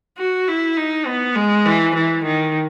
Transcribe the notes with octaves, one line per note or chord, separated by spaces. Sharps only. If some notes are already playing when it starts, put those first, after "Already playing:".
F#4
E4
D#4
B3
G#3
E3
E3
D#3